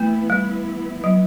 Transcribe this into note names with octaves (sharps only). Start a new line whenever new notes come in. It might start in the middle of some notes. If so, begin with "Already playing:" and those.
Already playing: E3 A3 B3 E4
G3
F#3